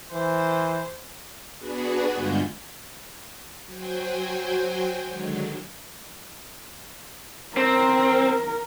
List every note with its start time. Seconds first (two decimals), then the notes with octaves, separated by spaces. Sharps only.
0.13 E3 C5
1.59 B3 D4 F#4 G#4 B4
2.14 G2 D3 G#3 F4 F#4 G6
3.66 F#3 F#4 C5 G5 G#5
5.06 D3 D#3 F#3 G#3
7.57 C4 A#4